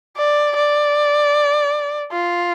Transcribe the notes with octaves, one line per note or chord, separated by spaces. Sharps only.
D5
D5
F4